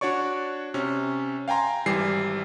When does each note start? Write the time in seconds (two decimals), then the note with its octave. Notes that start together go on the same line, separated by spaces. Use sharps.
0.01 D4 F#4 C#5 D5 C#6
0.74 C3 C#4
1.48 F5 G5 G#5 A#5 C6
1.86 G#1 E3 G3 C7